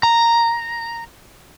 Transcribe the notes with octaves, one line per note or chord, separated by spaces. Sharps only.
A#5